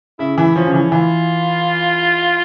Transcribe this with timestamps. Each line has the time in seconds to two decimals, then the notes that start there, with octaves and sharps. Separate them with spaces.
0.19 C#3 E4
0.37 E3 E4
0.56 F3 C#4
0.67 C#3
0.73 E3 C#4
0.92 E3 F4